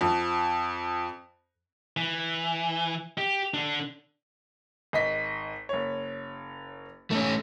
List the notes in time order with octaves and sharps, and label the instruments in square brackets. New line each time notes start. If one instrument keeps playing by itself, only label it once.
[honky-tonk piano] F2
[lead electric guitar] E3
G4
D3 D4
[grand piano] G#1 D#5 B6
F#1 C#5
[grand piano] B1 [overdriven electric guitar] A3 C#4